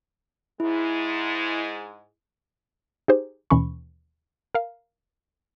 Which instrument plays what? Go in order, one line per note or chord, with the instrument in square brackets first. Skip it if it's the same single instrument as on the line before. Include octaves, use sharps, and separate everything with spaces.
[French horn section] G#2 G#3 [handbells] E4
[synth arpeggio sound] D#4 G4 G#4 C5
D#2 B2 E3 C#4 B5 C#6
A#4 F5